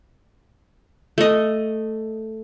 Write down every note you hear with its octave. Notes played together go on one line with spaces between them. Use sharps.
A3 D#5